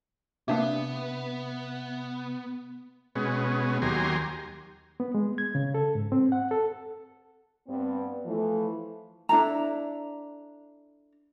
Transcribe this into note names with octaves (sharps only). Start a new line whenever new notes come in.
C3 A#3 B3 D4 G4 E5
B2 G#3 B3 C#4
D#2 F#3 G4 G#5 A#5 C6
B3
G#3
G#6
C#3
A4
G#2
C4
F#5
A4
G2 B3 C4
E3 F3 A3
D4 E4 A4 A#5